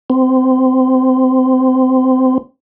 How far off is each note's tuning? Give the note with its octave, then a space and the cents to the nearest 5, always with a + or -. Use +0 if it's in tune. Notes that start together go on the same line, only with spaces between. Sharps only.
C4 -20